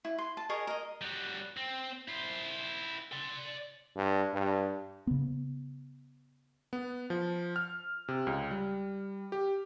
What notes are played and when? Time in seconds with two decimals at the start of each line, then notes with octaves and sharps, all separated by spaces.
0.05 E4
0.18 C6
0.37 A5
0.49 G#4 A#4 C#5 D#5
0.67 A#4 D#5
1.01 G3 F#4
1.57 C4
2.08 E4 C5
3.13 D5 C6
3.96 G2
4.33 G2
5.07 C#3 B3
6.73 B3
7.10 F3
7.56 F6
8.08 C3
8.27 C#2
8.51 G3
9.32 G4